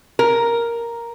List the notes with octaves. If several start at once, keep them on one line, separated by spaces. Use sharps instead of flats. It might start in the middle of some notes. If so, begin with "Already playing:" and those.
A#4